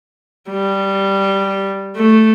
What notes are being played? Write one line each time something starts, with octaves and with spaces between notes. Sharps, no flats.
G3
A3